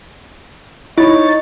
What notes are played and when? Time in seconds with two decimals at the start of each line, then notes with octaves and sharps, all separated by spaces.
0.98 D#4 E4 C#5 A6